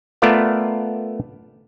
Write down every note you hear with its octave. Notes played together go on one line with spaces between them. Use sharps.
A3 B3 F4 A#4 D5 F5